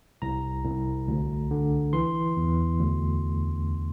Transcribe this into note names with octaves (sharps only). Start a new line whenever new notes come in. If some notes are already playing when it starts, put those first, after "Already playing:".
C2 A#5
C2
D2
D3
E3 C6
E2
D2